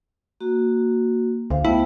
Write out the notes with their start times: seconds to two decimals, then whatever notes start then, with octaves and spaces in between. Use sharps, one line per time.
0.40 A#3 F#4
1.50 D2 C5 F5
1.65 A3 B3 E4 G5